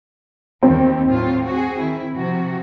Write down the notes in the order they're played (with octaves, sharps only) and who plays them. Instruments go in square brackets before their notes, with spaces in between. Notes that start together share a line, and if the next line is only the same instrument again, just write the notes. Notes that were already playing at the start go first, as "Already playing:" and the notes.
[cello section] D#2 [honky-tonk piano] C4
[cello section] A2 F#3 F4
F#4 G#4
D#3 E4
C3 F3 F#4